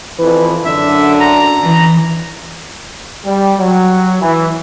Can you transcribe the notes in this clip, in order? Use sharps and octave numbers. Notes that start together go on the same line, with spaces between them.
F2 E3 B4
F#2 D3 E5
A#5
E3
G3
F#3
E3